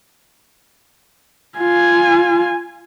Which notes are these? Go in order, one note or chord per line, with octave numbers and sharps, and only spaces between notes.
F4 G#5